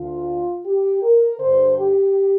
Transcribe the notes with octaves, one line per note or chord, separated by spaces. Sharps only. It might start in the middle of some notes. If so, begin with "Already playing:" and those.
Already playing: D2 D3 F4
G4
A#4
G2 D3 C5
G4